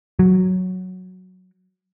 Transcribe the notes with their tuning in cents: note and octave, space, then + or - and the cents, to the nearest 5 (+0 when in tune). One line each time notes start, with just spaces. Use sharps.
F#3 -5